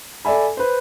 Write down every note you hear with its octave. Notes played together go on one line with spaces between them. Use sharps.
A4 D5 E5 G#5 B5
B4 C5